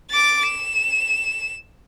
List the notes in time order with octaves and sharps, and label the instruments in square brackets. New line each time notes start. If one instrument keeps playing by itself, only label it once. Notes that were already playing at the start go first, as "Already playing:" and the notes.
[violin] D6 A6
E7